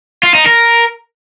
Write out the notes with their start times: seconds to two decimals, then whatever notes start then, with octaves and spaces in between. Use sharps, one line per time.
0.23 F4
0.35 D#4
0.46 A#4